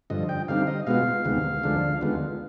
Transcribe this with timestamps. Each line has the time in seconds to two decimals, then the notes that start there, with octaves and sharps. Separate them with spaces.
0.10 G2 D3 F3 D#5
0.29 G5
0.48 D3 G3 C4 D#4 F5
0.67 D#5
0.87 B2 G#3 B3 F4 F5
1.25 D2 C3 D#3 G#3 B3
1.63 D2 D3 F3 G#3 D4
2.01 D#2 D3 G#3 B3 F4